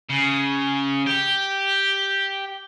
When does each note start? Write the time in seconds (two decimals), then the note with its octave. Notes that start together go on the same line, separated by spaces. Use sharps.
0.09 C#3
1.07 G4